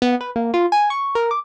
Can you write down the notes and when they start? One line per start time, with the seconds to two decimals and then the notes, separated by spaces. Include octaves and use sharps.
0.02 B3
0.21 B4
0.36 A#3
0.54 F4
0.72 G#5
0.90 C#6
1.15 A#4
1.31 D6